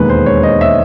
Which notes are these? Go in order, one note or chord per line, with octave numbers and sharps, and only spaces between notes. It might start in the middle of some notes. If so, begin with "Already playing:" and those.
Already playing: E1 D#2 D#3 G#3 B4
C5
C#5
D#5
E5